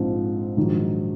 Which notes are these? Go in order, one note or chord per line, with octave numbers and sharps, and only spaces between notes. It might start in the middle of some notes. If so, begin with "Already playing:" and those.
Already playing: A#1 G#2 F3 C4
A#1 G#2 D#3 F#3